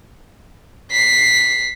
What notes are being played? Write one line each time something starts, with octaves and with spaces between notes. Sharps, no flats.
B6 C7